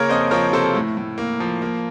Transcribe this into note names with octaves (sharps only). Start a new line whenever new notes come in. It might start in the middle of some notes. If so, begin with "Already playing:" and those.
Already playing: C#3 A#3 A#4 C#5
F2 C5 D#5
F3 A#4 C#5
C3 A4 C5
A2
A2
A#3
F3
A#3